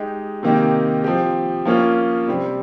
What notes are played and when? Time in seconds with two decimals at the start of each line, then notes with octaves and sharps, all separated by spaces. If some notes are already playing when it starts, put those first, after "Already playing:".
Already playing: G#3 D#4 G4
0.43 C3 D#3 A#3 D#4 G4
1.04 F3 C4 G4
1.65 F3 A#3 C#4 F4
2.27 C3 G3 C4